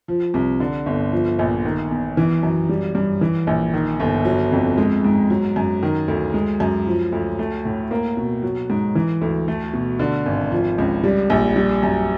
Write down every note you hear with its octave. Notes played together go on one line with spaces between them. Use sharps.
F3
C2
D3
G1
F3
A#1
D#3
E2
E3
F#2
G3
G2
E3
A#1
D#3
G1
F#3
F2
G#3
G#2
F#3
F#2
D#3
D2
G#3
F#2
F3
D2
A3
A2
A#3
B2
F#3
G#2
E3
D2
A3
B2
D3
G#1
F3
C#2
G3
A#1
G3
F#2